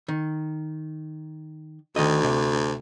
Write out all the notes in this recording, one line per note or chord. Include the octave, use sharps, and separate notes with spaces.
D#3
D2 D#3 D#5
C3